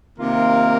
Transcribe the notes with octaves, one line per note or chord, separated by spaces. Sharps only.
C3 D#3 A#3 F4 A#4